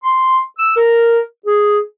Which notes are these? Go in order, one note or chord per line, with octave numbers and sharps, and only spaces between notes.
C6
E6
A#4
G#4